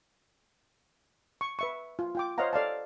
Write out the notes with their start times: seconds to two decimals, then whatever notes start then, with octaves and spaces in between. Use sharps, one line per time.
1.41 C#6
1.59 B4 E5 C#6
1.99 F4
2.15 F4 G5 D6
2.38 C5 C#5 D#5 F5 F#5 A#5
2.53 A4 D5 F5 A5